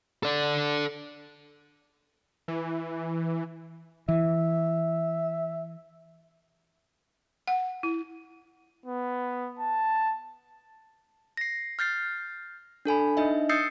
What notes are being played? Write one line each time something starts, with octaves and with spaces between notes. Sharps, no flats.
A4 D5
E3
E3 E5
F#5
E4
B3
A5
A#6 C7
F6 G6 A6 C7
D4 A4 G#5 B5
D4 D#4 D#5 E5
D#6 E6 G6 A6 C7 C#7